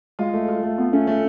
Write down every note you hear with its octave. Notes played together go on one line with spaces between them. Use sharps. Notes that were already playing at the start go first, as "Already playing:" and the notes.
G#3 F4
A3
F4
A3
B3 F4
A3 C#4
A3